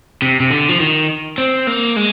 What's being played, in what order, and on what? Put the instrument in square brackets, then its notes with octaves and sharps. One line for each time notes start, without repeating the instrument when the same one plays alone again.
[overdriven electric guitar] C3
C3
D3
F3
D#3
C4
A#3
G#3